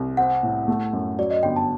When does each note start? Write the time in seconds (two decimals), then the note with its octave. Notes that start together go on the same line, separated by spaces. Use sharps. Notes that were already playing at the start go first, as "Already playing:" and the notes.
Already playing: C2
0.17 C4 F#5
0.43 A2
0.68 A3
0.93 F#2
1.18 F#3 D5
1.31 D#5
1.43 G1 G5
1.56 A5